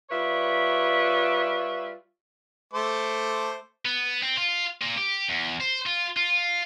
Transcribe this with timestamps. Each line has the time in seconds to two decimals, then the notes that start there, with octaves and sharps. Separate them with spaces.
0.10 G3 F4 B4 C#5 D5 E5
2.73 A3 C5 D6
3.85 B3
4.23 C4
4.37 F4
4.82 A#2
4.98 G4
5.29 E2
5.60 C5
5.86 F4
6.16 F4